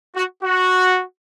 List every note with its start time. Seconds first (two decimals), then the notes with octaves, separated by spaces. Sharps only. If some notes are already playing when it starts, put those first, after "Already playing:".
0.15 F#4
0.44 F#4